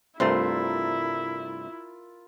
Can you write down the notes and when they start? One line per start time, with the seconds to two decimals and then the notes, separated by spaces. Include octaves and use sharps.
0.20 C2 G2 A3 E4 F4 A#4 C5